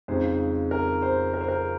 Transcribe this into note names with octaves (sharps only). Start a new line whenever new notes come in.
F2 C#3 G#3 D#4 C5
A#4
C5
A#4
C5
A#4